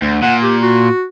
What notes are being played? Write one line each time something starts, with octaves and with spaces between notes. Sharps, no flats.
D2
A#2 F#5
G4
F#4